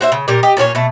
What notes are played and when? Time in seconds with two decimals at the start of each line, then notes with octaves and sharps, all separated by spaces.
0.01 F#4 C5 E5
0.12 C#3
0.28 A#2 G3 A#4
0.43 G4 D#5
0.57 A#2 C#4 G4 C#5
0.75 B2 A3